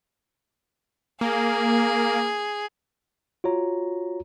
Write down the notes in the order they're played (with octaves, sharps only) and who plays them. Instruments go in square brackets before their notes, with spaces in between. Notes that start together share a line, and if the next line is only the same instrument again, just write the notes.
[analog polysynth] A#3 [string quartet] G#4
[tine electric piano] F4 F#4 C#5 A#5